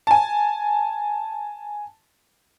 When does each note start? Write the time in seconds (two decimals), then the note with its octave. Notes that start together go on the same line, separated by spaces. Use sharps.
0.07 G#5 A5